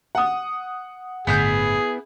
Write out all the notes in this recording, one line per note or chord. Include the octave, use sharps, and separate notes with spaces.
F#5 D#6
G1 A2 D3 B3 E4 G#4 G6